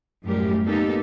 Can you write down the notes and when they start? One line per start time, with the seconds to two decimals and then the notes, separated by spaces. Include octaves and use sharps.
0.23 F#2 A2 G3 G#3 G4 A#4
0.65 A#3 B3 D#4 G4 A4